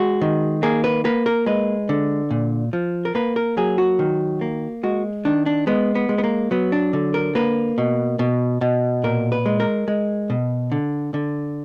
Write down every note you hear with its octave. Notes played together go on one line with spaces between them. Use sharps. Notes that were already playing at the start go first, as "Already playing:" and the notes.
Already playing: G#3 F#4
D#3
A#3 G#4
B4
A#3 B4
A#4
G#3 B4
D3
A#2
F3
A#4
A#3 B4
A#4
F#3 G#4
F#4
D#3
A#3
G#3 F#4
D#3 D4
D4
G#3 B3
B3
G#3
B3
A#3
F#3 B3
D4
D3
A#4
A#3 B4
B2
B2
B2
A#2 A#4
B4
G#3
A#4
G#3
B2
D3
D3